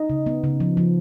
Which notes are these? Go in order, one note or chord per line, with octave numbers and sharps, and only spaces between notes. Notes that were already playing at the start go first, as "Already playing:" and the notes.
Already playing: D#4 D#5
C#3
B3
C#3
F3
F3